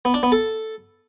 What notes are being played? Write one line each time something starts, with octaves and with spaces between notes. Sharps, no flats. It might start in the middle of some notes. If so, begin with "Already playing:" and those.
B3
D4
B3
A4